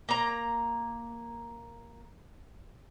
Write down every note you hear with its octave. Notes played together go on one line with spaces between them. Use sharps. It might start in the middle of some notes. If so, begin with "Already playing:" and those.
A#3 A#5